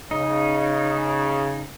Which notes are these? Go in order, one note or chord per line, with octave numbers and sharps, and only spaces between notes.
C#3 D#4